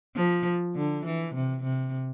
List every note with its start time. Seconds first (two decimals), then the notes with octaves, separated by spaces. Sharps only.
0.15 F3
0.75 D3
1.05 E3
1.34 C3
1.63 C3